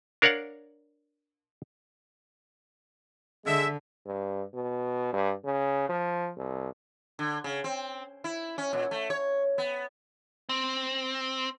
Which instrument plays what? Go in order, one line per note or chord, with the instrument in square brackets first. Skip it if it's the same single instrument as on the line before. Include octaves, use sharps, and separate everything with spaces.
[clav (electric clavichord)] D4 A#4 C#5 D5 F5 F#5
[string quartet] D3 [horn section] G#3 E5
[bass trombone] G2
B2
G2
C#3
F3
C2
[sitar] D3
C#3
C4
E4
C#4
A#2
A3
C#5
B3
[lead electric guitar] C4